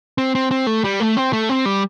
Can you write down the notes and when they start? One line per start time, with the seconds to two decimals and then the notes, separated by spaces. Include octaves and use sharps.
0.18 C4
0.35 C4
0.51 C4
0.67 A3
0.84 G3
1.00 A3
1.17 C4
1.33 A3
1.49 C4
1.65 G3